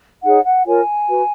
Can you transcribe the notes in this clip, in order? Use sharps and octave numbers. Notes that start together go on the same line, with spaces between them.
D#4 G#4 C#5 F#5
F#5
F4 A#4 C#5 G#5
F#4 B4